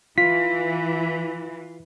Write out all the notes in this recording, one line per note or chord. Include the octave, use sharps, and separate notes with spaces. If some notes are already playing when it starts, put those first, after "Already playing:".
E3 F4 B6